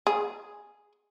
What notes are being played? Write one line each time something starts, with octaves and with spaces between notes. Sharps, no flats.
G#4